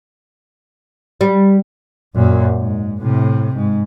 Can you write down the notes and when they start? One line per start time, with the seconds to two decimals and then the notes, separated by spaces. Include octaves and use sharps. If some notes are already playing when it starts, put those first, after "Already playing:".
1.21 G3
2.15 F#2 A#2
2.57 G#2
3.01 A2 C3
3.55 G#2